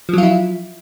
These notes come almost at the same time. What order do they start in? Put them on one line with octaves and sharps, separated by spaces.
F3 F#3 F4 E4